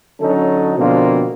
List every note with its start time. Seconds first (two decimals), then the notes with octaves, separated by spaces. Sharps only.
0.21 D3 F#3 C#4 D#4 A4
0.78 B2 D3 F3 A#3 C4 F4